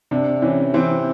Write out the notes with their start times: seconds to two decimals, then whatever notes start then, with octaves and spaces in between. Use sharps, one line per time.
0.11 C3 D4
0.42 E3 C#4
0.74 E3 C4